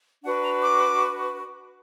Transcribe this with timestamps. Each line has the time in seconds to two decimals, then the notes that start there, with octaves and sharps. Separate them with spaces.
0.23 D4 F#4 B4 F#5
0.42 A#5
0.62 D6